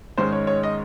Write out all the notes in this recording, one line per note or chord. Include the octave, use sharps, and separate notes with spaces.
G#2 D#3 G#3 C#4 C5
C#5
C#5
D#5